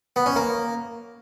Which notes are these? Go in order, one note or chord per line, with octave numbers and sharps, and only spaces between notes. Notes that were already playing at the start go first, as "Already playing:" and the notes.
B3
C#4
A#3